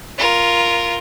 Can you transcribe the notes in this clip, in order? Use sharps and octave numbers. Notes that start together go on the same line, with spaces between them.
F4 A#4